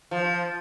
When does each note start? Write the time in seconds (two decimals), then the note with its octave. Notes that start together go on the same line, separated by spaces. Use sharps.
0.11 F3